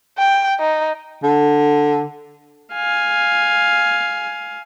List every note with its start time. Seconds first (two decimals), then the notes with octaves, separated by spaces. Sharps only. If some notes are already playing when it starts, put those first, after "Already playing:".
0.18 G5
0.60 D#4
1.23 D3
2.73 F5 G#5